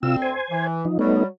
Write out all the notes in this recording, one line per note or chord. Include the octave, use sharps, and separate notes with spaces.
D2 C3 C4 F4 E6
C5 G#5
E3
F3 D#4
F#3 G3 A3 B3 D#4